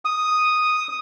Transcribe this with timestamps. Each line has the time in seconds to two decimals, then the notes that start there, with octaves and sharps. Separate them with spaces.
0.05 D#6